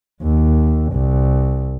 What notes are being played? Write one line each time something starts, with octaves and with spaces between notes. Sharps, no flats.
D#2
C2